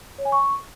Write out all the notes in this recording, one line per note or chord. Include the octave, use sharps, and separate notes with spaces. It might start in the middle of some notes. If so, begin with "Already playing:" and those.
C#5
G#5
C#6